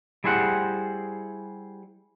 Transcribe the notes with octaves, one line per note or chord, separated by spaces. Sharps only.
G3 E4 G#4 C5 F#5